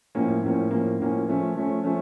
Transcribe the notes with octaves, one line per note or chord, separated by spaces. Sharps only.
A2 F3 A#3 C#4
A2 F3 A#3 C#4
A2 F3 A#3 C#4
A2 F3 A#3 C#4
F3 A3 C#4
F3 A3 C#4
F3 A3 C#4